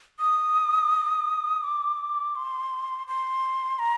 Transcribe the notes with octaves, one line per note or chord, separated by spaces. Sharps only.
D#6
D6
C6
C6
A#5